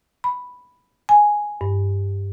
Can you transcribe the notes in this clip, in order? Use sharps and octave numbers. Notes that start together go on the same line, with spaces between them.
B5
G#5
G2